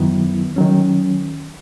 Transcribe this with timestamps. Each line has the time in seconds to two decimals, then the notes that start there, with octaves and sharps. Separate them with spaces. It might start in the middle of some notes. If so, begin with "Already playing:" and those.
Already playing: F#2 D#3 F#3 B3 E4
0.56 D#3 F#3 C#4